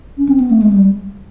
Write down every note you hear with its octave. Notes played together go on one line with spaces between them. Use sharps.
C#4
C4
B3
A3
G#3
G3